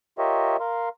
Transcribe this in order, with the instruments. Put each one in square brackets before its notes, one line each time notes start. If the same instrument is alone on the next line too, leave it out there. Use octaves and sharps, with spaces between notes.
[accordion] F4 G4 A#4 C#5 D#5 E5
A#4 F5 C6